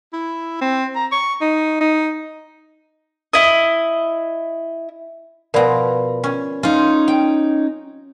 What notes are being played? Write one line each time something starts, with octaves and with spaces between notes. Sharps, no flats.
E4
C4
A#5
C#6
D#4
D#4
E4 D#5
B2 F3 A#4 D5 B5
C#4
C#4 D#4 F4
G5